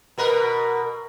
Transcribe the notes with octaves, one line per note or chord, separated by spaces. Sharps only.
B2 A#4 B4